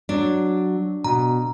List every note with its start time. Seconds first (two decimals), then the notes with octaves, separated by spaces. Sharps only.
0.09 F#3 D4
1.04 B2 A#5